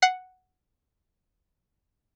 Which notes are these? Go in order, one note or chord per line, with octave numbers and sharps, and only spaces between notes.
F#5 C7